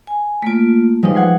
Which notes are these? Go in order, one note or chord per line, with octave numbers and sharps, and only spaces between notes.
G#5
A3 A#3 F4 B6 D7
F3 G3 G#3 D#4 B4
F#5 G#6 C7